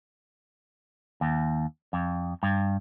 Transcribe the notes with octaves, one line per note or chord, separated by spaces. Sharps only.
D#2
F2
G2